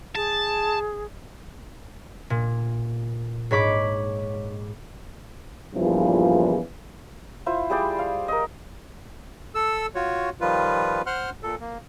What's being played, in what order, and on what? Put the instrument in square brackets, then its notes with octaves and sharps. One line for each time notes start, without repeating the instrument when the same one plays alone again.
[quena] G#4 [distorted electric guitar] A5
[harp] A#2
G#2 C#5 B5 D6
[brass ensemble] E2 G2 A#2 C#3 E3 F3
[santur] E4 F4 C5
G3 G#4 D5 G5
F5
A#4 D#5
[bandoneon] A4 E6
F4 F#4 C#5
D#3 F3 G3 F4 B4
C5 F#5 C6 F6 F#6
A#2 A4
A#3